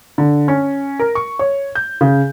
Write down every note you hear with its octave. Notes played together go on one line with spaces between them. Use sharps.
D3
C#4
A#4
C#6
C#5
G6
C#3